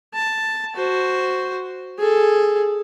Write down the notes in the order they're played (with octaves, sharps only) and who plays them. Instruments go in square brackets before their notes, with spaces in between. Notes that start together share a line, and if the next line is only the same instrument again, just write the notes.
[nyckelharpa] A5
F#4 C5
G#4 A4